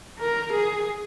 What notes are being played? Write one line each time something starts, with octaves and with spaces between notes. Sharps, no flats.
A#4
G#4